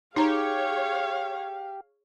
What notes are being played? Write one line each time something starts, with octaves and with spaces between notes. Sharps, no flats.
D#4 G4 G#4 C#5 F5 A#5